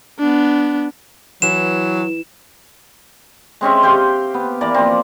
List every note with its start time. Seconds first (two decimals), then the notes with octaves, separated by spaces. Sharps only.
0.19 B3 D4
1.42 E3 F#3 E7
3.61 G#3 C4 C#4 E5
3.83 G4 C5 F5 G5
4.34 B3
4.61 E3 A#3 D5
4.74 F3 C4